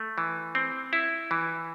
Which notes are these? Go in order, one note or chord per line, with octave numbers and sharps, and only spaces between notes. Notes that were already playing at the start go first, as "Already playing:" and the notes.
Already playing: A3
E3
C4
E4
E3